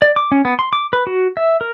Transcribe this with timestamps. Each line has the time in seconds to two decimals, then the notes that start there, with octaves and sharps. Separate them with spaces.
0.02 D5
0.16 D6
0.32 C#4
0.45 B3
0.59 C6
0.73 D6
0.93 B4
1.07 F#4
1.37 E5
1.61 A#4